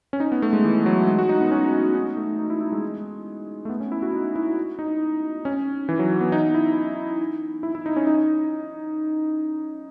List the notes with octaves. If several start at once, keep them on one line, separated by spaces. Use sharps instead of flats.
C#4
D#4
B3
A3
G#3
E3
F#3
G#3
F#4
D#4
B3
C#4
D#4
D#4
A3
D#4
E4
E4
G#3
A3
B3
C#4
E4
F#4
D#4
E4
D#4
C#4
E3
F#3
B3
D#4
E4
E4
E4
D#4
C#4
D#4